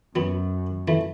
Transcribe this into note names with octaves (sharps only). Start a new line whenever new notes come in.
F#2 F#3 B3
E3 A3